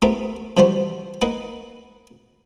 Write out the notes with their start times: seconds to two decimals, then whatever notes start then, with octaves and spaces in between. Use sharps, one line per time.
0.02 A3 B3 C4 E4 G4 A#4
0.57 C3 E3 F3 G3 F#4 C5
1.22 A#3 D#4 B4 F#5